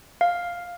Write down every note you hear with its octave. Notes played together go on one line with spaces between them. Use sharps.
F5